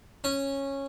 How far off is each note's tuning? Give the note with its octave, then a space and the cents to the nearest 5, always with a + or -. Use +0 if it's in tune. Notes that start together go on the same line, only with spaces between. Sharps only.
C#4 -10